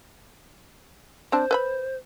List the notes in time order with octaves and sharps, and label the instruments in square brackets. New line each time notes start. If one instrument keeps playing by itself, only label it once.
[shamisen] C4 D4 A5 [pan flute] C5
[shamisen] B4 E5 B5